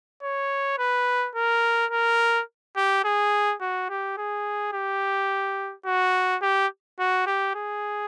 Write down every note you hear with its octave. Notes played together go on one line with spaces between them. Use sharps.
C#5
B4
A#4
A#4
G4
G#4
F#4
G4
G#4
G4
F#4
G4
F#4
G4
G#4